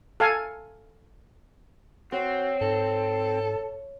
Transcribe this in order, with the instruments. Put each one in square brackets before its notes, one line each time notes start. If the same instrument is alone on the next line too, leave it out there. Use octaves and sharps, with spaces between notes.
[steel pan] A4 F5 G#5
[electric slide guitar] C4 [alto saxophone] F#4 [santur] C#5
[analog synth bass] G#2 [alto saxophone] A4